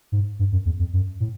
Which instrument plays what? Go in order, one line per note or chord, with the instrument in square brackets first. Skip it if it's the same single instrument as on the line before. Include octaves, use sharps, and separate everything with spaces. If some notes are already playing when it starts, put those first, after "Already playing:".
[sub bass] G#2
G2
F#2
E2
F2
F#2
A2